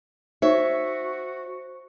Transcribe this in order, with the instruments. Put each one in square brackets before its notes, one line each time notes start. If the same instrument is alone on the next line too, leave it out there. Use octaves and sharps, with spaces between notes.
[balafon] D#4 [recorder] F#4 [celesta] C5 [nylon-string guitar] C#5 E5